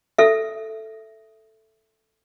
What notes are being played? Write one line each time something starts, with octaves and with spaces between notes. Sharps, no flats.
A4 E5